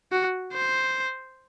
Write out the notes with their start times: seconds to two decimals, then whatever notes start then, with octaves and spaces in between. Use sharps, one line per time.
0.12 F#4
0.53 C5